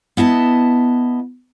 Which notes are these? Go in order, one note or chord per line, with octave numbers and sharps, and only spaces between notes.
B3 E4 D#5 A5